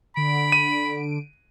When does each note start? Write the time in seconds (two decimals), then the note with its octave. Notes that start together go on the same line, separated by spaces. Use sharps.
0.16 D3 B5 D7
0.52 D#7